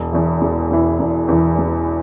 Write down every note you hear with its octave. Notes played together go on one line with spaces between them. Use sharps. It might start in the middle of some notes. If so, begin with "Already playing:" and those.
Already playing: E1
E2 E3
E1
E2 E3
E1
E2 E3
E1